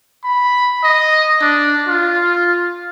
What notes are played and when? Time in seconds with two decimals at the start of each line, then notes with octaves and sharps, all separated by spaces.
0.24 B5
0.84 D#5
1.41 D4
1.88 F4